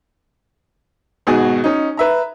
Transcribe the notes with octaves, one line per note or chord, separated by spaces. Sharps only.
G#1 B2 F#4 G#4 G#5
C#4 D#4
B4 E5 A#5